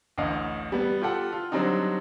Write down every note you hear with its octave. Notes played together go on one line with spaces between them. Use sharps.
A1 D2 D#5 F5
G3 B3
F4 G4 A4 F#5
F4
D3 F#3 G3 C4 D4 D#4